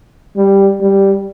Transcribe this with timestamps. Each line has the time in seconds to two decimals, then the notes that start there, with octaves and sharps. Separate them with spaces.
0.36 G3
0.81 G3